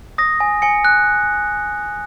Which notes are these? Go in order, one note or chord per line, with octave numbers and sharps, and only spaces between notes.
D#6 A#6
G#5
G#5 C#7
F#6